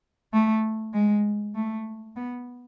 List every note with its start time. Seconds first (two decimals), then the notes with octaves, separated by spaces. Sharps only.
0.33 A3
0.94 G#3
1.55 A3
2.17 B3